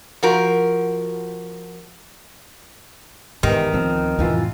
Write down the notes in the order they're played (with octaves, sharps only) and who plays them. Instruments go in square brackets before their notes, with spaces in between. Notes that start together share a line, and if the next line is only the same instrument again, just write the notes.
[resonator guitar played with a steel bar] F3 F#4 A#4
[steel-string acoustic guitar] E2 G4 [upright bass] G#2 [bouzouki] D#3
[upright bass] D2 [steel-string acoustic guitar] F3 C4
[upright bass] F2 A2 [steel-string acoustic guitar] C3 E3 F4